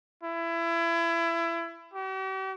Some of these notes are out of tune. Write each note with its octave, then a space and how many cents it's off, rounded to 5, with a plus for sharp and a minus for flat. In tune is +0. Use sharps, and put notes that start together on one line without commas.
E4 +25
G4 -45